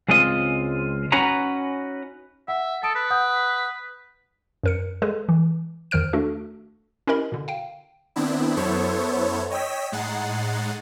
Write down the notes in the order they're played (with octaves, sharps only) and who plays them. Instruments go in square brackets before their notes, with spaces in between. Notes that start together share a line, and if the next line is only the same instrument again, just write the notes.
[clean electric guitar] C#2 G#3 C4 F4 D#5
C#4 D#4 F#4 B4 C#5 A#5
[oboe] E5 [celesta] F#5
[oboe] A4 [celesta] A5 D#6 D7
[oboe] B4
[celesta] F#5 D#6 G6
[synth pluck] F#2 A#4 C#7
G#3 G#4 A4 B4
E3
E2 D#3 C5 F6 D7
A3 D4 F#4 A4
C#4 E4 G4 A#4 D#5 B5
B2 D3
F5 G5
[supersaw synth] D#3 B3 C4 D4 E4
F#2 B3 E4 A4 C5 C#5
C#5 D#5 G5 E6 B6
A2 G#3 D#4 F#5 A6 C7